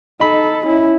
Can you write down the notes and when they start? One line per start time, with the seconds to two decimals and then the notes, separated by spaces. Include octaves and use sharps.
0.20 D#4 A4 D#5 B5
0.66 C#4 E4